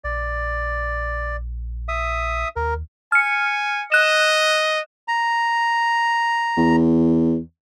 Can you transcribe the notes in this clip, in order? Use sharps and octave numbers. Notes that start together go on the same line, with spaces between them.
A#1 D5
E5 D#6
D#2 A#4
G#5 F6 C#7
D#5 F#6 E7
A#5
E2